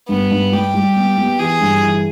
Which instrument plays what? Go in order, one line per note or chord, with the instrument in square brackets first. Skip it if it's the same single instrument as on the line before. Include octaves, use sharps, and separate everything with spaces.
[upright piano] G2 [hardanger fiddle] B3
[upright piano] G2
[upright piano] G3 [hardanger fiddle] G4
[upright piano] G3
B3
B3
[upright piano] E3 [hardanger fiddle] G#4
[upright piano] G2
E3